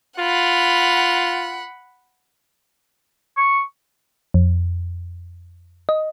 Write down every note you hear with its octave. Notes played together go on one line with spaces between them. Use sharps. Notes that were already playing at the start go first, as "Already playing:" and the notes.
F4 F#5 B5
C#6
F2
D#5